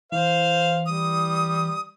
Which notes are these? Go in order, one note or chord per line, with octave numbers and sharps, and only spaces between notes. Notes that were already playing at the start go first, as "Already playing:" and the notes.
E3 C5 F5
G3 D#6